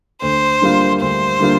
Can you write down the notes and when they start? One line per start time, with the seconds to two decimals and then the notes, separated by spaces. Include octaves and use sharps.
0.22 D2 C5
0.61 D3 G3 A#3 F4
1.00 D2 C5
1.40 D3 G3 A#3 F4